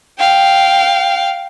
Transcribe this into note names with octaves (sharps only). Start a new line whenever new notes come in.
F5 G5